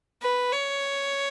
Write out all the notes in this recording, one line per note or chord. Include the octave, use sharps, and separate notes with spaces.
B4
C#5